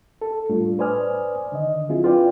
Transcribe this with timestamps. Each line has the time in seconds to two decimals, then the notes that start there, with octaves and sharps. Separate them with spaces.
0.22 A4
0.50 A2 G3 A3 D4 F4
0.79 B4 C5 D5 G#5 D#6 F6
1.52 D3 D#3 D#5
1.89 F#3 C4 D4 E4 F4 G#4
2.04 F4 B4 D5 G5